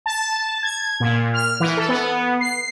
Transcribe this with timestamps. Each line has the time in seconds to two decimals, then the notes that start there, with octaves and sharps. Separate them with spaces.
0.06 A5
0.63 G#6
1.00 A#2
1.34 F6
1.60 E3
1.77 A4
1.89 B3
2.41 C7